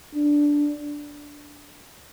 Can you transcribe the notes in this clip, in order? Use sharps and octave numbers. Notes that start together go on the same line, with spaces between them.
D4